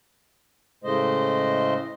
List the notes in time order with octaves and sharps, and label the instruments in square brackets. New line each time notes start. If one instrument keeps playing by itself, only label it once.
[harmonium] A2 C#3 G#3 A3 C5 D#5